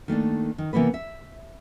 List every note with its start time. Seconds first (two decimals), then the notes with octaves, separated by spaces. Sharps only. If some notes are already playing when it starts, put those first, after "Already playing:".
0.08 D#3 A3 A#3 D4
0.58 D#3
0.73 C3 E3 A#3 B3 B4
0.94 E5